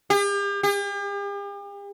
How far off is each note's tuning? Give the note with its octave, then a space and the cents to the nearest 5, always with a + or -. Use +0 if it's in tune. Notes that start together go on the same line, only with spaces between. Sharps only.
G4 +40
G4 +45